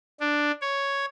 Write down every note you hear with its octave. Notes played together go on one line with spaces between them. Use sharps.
D4
C#5